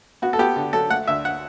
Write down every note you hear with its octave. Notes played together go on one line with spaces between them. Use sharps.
B3 F#4
A4
B3 G4
D3
F#3 A4
A3 F#5
D2 E5
F#5